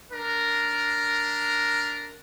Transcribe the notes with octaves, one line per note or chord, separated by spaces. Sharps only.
D4 A#4